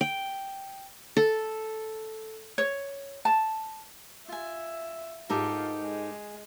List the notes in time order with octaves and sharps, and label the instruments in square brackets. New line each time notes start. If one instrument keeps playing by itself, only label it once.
[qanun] G5
A4
[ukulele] C#5
A5
[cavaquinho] F4 G#5 [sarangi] E5
[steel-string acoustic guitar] G#2 D#4 [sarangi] F4 [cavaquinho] G4 A4 A#4
[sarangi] G#3